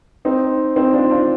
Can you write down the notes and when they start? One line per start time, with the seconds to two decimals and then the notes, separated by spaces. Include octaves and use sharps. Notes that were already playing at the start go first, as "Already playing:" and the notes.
0.25 C4 D#4
0.76 C4 D#4
0.93 D4 F4
1.10 D4 F4